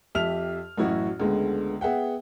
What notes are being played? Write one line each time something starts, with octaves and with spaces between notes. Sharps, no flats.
F2 G4 E5 F6 F7
A1 F#2 E4 F#4
C#2 D3 G#3 A3 B3
B3 G#4 E5 F#5 G5